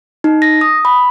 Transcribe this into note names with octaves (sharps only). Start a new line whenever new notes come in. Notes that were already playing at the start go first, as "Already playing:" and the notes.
D#4
A#6
D#6
B5